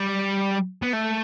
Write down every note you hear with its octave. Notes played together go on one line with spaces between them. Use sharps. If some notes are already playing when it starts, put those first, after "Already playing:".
Already playing: G3
B3
A3